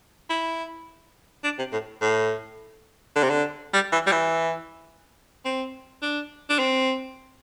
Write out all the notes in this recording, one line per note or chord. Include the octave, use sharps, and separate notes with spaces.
E4
D4
C3
A2
A2
D3
C3
D3
G3
E3
G3
E3
C4
D4
D4
C4